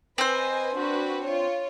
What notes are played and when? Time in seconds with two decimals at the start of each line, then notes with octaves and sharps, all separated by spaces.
0.18 C4 B4 C5 D#5 G#5
0.74 D4 F#4 B4
1.25 F4 C#5